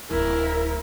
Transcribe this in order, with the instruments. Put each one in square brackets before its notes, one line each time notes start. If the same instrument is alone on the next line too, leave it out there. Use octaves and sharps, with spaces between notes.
[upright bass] D1 [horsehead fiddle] E4 A#4